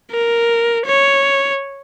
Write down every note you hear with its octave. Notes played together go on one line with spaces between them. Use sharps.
A#4
C#5